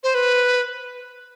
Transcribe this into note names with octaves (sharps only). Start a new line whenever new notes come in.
C5
B4